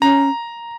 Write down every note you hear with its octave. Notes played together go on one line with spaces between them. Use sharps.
C#4 A#5